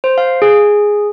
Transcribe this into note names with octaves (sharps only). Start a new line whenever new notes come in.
C5
F5
G#4